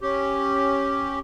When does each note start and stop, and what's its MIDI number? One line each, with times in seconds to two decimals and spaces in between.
0.01 1.19 61
0.01 1.19 67